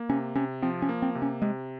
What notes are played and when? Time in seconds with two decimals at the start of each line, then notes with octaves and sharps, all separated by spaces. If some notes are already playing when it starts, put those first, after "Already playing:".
Already playing: A#3
0.10 C3 C#4
0.35 C3 C#4
0.62 F3 C4
0.82 C#4
0.89 A#3
1.02 C4
1.15 C3
1.22 C#4
1.42 C3 G#3